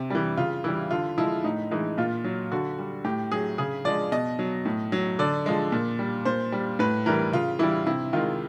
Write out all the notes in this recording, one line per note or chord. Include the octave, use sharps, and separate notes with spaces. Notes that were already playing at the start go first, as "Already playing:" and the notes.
Already playing: C3
E3 G3
C#3 F4
E3 G3 E4
D3 F4
F3 G#3 E4
A2 D#4
E3 G#3 D#4
A#2 F4
F#3
D3 F#4
G3
A2 G4
F#3 G#4
C#3 G#4
F3 G#3 D5
B2 D#5
F#3
A2
F#3
D3 D5
F3 G#3
A#2
G3
A#2 C5
G3
A2 B4
E3 G3 A#4
C#3 F4
E3 G3 E4
C3 E4
D#3 G#3 F4